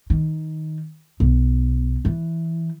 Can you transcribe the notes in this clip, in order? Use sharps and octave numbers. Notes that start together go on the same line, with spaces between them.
D#3
B1
E3